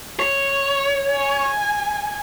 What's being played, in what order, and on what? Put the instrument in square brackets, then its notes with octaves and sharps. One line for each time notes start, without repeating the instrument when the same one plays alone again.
[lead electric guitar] C#5
[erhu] G#5